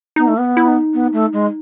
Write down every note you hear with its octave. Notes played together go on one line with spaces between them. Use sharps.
B3 D#4
A3
B3
E4
D#4
B3
A3
G#3